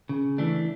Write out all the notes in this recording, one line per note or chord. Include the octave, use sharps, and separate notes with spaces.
C#3
E3 A3 D4